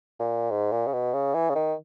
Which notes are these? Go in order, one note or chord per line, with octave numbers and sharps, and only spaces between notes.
A#2
G#2
A#2
C#3
B2
C#3
E3
C#3
D#3